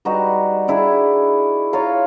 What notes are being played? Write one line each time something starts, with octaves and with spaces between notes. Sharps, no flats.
G3 D#4 F#4 B4
D4 E4 G#4
F4 C#5 F5 A#5